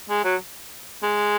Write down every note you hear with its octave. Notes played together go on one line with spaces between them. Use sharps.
G#3
F#3
G#3